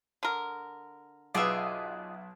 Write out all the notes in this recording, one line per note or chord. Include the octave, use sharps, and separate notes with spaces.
D3 A#4
B1 F4 G#4 B4 D#5 E5 D6